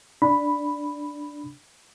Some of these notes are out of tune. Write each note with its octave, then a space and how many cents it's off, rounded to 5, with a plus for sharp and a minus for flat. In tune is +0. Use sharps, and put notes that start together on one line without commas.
D4 +0 B5 +0